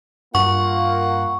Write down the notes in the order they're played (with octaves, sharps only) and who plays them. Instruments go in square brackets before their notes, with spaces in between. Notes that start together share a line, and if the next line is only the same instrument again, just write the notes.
[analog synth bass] G2 [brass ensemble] A#3 F4 [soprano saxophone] F#5 [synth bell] C#6